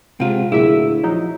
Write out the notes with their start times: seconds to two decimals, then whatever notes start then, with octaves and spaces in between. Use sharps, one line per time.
0.20 C3 G#3 F4 F#5
0.52 D2 A#2 F#3 E4 G#4 E5 C#6
1.04 F3 F#3 D#4 C#5